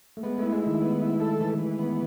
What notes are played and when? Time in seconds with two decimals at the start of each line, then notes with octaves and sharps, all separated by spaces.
0.17 A3
0.23 G#3 B3
0.38 A3 E4
0.52 G#3
0.62 D#3 E4
0.81 B3
1.01 E4
1.20 A4
1.40 E3
1.58 E3
1.79 B3